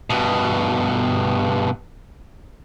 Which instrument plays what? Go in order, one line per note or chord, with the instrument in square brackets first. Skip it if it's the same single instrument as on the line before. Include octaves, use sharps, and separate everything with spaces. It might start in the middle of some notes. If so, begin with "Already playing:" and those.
[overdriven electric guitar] G2 B2